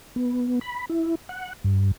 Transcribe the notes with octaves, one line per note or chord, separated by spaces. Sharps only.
B3
B5
E4
F#5
G2